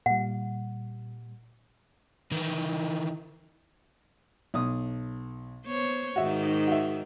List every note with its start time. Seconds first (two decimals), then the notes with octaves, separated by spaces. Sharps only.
0.06 A#2 G3 F#5
2.32 D#3 E3
4.54 B1 D#6
5.65 B3 C5 C#5
6.16 G#2 D#3 F#4 E5
6.67 F#4 E5